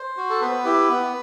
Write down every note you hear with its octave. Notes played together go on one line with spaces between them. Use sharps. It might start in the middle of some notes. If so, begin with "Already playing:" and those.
Already playing: C5
F#4
A4
B3 B4
E4 G4
B3